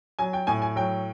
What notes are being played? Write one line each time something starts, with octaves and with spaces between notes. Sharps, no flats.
F#3 G#5
G5
A2 G#5
G#5
F#3 G5